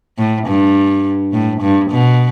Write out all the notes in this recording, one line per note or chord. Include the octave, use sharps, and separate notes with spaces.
A2
G2
A2
G2
B2